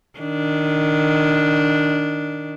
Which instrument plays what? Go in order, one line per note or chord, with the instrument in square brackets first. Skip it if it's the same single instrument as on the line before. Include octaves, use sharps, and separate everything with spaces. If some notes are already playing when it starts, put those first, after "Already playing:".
[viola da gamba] D#3 D4